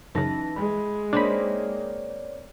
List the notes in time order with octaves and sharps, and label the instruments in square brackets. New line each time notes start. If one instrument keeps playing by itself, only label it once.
[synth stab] F#2 C#3 [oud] E3 [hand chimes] D#4 A5 A#6
[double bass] G#3 [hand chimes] B5
[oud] A#3 C4 D#4 [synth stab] D4 B5 [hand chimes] C#5 D5